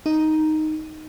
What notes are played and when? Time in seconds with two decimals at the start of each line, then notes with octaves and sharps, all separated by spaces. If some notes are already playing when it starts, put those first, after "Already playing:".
0.06 D#4